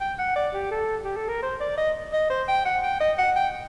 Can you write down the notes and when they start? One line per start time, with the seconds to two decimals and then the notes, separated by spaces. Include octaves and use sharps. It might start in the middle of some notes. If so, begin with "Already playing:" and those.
0.01 G5
0.19 F#5
0.36 D5
0.54 G4
0.71 A4
1.04 G4
1.16 A4
1.29 A#4
1.43 C5
1.60 D5
1.78 D#5
2.13 D#5
2.30 C5
2.48 G5
2.65 F#5
2.83 G5
3.00 D#5
3.18 F#5
3.36 G5